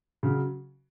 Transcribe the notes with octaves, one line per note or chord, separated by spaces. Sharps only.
C#3 F#3